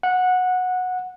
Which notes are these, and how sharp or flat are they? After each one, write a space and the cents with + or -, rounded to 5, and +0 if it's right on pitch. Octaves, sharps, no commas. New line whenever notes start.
F#5 -15